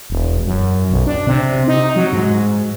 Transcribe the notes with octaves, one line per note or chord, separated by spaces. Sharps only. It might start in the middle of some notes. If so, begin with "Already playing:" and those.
E1
F#2
B1
D4
C3
D#4
F#3
G#2